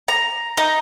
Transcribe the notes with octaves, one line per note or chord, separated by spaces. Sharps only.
A#5
D#4